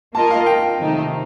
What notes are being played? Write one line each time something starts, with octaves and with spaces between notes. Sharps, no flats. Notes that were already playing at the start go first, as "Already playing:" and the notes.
A#3 F4 A#4 D#5 A5
F5
G5
C3 D#3 A3 D#4